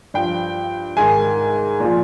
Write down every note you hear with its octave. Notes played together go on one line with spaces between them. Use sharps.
G2 F3 G5
G#2 D#3 G#5
A#2 F3